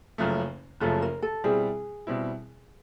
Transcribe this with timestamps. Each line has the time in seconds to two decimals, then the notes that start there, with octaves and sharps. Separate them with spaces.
0.18 F#1 F#2 C#3 F3 A3
0.81 F#1 F#2 C#3 F3 A3 A4
1.02 A#4
1.22 A4
1.44 B2 G3 C4 E4 G#4
2.07 B2 G3 C4 E4